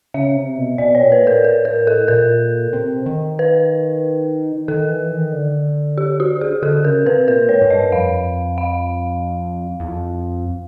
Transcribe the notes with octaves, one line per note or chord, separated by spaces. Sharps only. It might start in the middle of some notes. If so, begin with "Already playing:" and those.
C#3 E5
C3
B2
B2 D5
C#5
A#2
B4
A2 A#4
A#4
A#4
A4
A#2 A#4
C3
D#3
B4
D#3 A4
E3
D#3
D3
G4
F#4
G#4
D3 A4
C#3 A#4
C3 B4
A#2 A#4
G#2 C#5
G#2
G2 D#5
F2 F5
F5
E2
F2